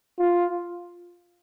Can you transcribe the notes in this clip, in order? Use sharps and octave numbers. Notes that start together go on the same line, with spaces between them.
F4